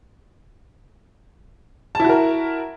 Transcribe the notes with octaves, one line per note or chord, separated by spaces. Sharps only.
E4 F#4 A#4 A5